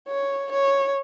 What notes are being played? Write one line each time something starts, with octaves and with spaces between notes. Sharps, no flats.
C#5
C#5